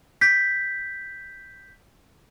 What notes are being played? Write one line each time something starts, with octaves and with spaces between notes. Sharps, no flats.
G6 B6